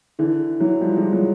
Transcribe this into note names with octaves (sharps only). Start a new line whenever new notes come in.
D3 E3
E3 F#3
F3 G3
G#3
F3 G3
F#3 G#3